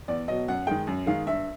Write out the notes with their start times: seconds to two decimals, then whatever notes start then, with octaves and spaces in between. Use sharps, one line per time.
0.08 E2 D5
0.28 B2 F#3 D#5
0.48 F#2 F#5
0.67 D#3 G#3 G5
0.87 F#2
1.06 D#3 G#3 F5
1.26 G2 E5